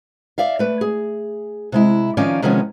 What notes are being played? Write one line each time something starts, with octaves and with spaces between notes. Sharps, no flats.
D5 E5 F5
A3 B4
G#4
C3 G#3 E4
D#3 F3 C#4 D#4 D5 F5
C3 D#3 F3 G#3 B3 C#4